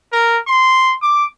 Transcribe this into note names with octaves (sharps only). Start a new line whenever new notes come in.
A#4
C6
D6